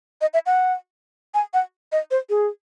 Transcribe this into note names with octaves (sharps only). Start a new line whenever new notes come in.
D#5
E5
F#5
G#5
F#5
D#5
C5
G#4